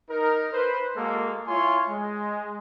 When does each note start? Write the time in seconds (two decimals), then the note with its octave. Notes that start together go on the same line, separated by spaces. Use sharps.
0.10 D#4 A#4
0.53 B4 C5
0.96 G#3 A#3 F#4 A4
1.47 E4 F4 C#5 G#5 C6
1.89 G#3